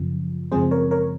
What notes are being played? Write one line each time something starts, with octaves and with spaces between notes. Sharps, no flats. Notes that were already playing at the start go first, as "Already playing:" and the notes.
Already playing: F#2 C#3 F3
F#2 C#3 F3 G#3 C4 G#4 C5
A#4 C#5
A#4 C#5